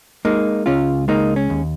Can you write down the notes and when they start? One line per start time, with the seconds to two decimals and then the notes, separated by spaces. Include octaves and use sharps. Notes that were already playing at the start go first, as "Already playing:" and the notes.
0.25 G#3 A#3 D#4
0.66 C#2 C#4 F4
1.08 G#3 A#3 D#4
1.36 C#4
1.50 D#2